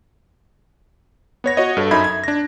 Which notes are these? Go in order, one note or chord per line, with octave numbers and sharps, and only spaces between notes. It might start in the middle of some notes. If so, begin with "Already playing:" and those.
B3 C#5 A#6
F#4 C#5 D#5
G2 A4
F#2 D#4 E5 B5 G#6
G#6
D4 A#6